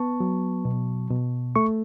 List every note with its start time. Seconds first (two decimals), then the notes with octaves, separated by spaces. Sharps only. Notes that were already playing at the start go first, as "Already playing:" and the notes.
Already playing: B3 A5 C#6
0.20 F#3
0.65 B2
1.11 B2
1.56 A3 C#6